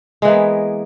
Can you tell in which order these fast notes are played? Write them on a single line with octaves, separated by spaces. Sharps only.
G#3 E3 A#3 B3